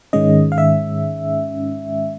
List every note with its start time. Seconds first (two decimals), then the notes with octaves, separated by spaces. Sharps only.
0.13 G#2 D#3 G#3 C#4 D#5
0.52 F5
0.58 E5